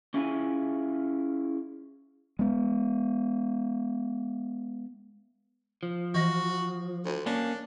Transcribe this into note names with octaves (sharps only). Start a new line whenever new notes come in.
C#4 E4 F4 G#4 E5 G#5
G#3 B3
F3
E3 F#4 D#5 A#6
D2
A#3 C#4 D4